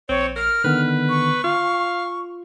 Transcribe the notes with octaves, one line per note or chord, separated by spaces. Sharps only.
A#1 C4 C#5
A#4 F6
D3 D#3 B3 B4
C#6
F4 F5